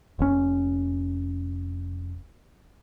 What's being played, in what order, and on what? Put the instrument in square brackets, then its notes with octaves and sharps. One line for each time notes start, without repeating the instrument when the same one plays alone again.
[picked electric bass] F1 C#4